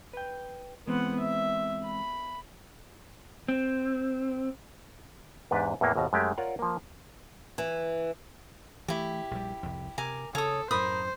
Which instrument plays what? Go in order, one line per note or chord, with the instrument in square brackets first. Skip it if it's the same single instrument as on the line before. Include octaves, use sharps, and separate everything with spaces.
[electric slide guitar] B4 G5
[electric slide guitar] E3 G#3 C4 [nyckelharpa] B3 F#5
[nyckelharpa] E5
B5
[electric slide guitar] C4
[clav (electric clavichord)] E2 G#2 D4 G4 B4
E2 A2 E3 A#3
G#1 D#2 B2 A#5
F#2 G#3 A3 G4
F4 A#4 C#5 D5 F#5
F3 A#3
[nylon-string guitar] E3
[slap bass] E3 F#3 A3 [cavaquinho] E4 G4
[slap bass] A#1 G3
C2 F2
[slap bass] C3 [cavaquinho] A#4 G#5 D6
[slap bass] C#3 [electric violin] A4 [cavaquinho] C#5 D#6
[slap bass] F#2 A2 [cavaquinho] A#4 B5 D#6 [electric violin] C5